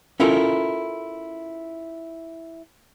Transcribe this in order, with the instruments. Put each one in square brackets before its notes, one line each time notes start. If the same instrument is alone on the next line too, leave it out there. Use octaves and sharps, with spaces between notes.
[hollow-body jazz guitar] C#4 E4 F4 A4 A#4